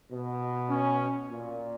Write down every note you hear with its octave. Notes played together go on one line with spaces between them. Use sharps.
B2
C#4
A#2